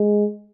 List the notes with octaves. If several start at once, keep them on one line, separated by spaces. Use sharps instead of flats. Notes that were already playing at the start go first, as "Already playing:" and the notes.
Already playing: G#3